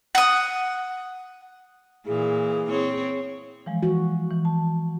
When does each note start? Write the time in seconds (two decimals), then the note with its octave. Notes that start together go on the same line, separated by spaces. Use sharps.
0.15 F#5 D#6
2.06 A#2 E3 G#4
2.69 C4 C#5
3.66 E3 F3 G#3
3.83 E3 F#4
4.30 E3
4.45 A5